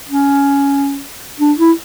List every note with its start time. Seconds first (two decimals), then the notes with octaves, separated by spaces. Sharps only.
0.09 C#4
1.39 D4
1.59 E4